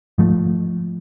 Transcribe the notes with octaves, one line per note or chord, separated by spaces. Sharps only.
G#2 F3 A3